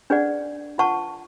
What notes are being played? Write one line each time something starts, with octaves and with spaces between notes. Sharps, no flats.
D4 G#4 B4 D5 F#5
F4 B4 F#5 A5 C#6